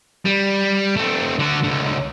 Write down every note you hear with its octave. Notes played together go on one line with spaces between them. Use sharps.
G3
A3 C4
D3 F#4
C#2 D3